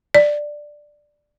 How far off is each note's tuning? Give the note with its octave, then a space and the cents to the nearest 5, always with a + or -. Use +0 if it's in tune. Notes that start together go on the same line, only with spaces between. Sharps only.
D5 +10